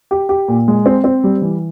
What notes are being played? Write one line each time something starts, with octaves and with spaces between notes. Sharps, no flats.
G4
G4
A#2
G#3
C4
C4
G3
E3